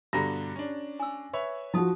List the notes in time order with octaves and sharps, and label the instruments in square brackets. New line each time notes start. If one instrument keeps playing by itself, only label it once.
[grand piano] G2 B2 D3 [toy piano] G4 A#5 B5 [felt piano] A#6
[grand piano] C#4 D4
[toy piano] G#5 E6
[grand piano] B4 C#5 E5
[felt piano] F3 F#4 [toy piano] D#4 A5 D#6